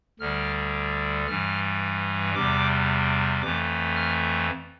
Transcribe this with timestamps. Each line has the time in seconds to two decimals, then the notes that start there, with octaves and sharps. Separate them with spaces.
0.19 D2 D3 G3 F6
1.27 G2 E3 G3 F6
2.34 E2 C3 G3 D6
3.42 F2 E3 A3 D6
3.96 F6